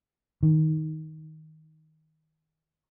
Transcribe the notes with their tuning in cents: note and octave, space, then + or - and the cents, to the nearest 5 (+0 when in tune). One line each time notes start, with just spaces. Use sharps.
D#3 +10